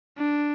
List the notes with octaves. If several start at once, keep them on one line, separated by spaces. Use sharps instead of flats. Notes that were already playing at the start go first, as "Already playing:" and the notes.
D4